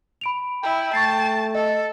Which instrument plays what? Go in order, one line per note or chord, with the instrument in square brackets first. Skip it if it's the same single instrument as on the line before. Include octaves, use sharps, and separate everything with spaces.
[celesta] B5 D7 F7
[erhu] E4 [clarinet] G5
[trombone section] A3 [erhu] A5 [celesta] C#6 A6 C7
[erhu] A4 [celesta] D#5